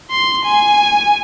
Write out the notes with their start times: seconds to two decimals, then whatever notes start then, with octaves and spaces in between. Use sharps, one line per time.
0.11 C6
0.45 G#5